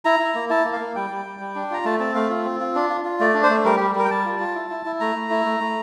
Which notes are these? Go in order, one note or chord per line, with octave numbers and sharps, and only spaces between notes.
E4 A#5
E4
A#3
E4 A5
A#3
F5
A#3
G3 G5
G3
G3
G3
D4
F4 A#5
A3 A5
C4 A5
A3 F5
F4
C4
F4
D4
F4
F4
A3 D5
D4
C5
A3
G3 A#4
G3 G4
G3 A#4
G5
G3 A5
F4
F4
E4
E4
E4
A3 A#5
A3
E4
A3
A3